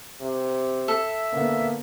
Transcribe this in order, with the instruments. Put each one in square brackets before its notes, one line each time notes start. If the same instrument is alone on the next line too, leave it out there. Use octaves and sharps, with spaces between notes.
[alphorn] C3
[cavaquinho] A4 [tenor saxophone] E5
[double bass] D3 B3 [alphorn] A#3